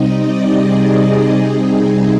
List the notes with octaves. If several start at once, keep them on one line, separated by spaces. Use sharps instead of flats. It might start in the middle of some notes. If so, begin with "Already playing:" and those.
Already playing: C3 G3 C4 D#4 D#5
D5
G#4
C3 G3 C4 D#4 G#4